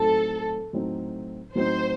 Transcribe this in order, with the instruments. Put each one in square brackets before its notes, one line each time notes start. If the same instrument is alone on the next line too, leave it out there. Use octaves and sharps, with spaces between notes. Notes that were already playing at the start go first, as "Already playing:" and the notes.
Already playing: [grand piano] A2 F#3 C4 D#4 [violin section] A4
[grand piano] A2 F#3 C4 D#4
[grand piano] A2 F#3 C4 D#4 [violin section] C5